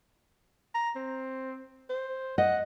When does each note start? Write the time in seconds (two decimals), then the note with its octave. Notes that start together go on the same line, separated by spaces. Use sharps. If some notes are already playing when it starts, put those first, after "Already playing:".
0.75 A#5
0.96 C4
1.90 C5
2.38 D#5 F#5